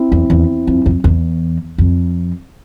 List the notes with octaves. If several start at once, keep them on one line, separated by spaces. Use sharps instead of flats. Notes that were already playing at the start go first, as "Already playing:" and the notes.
Already playing: C4 E4
E2
E2
F2
F2
E2
F2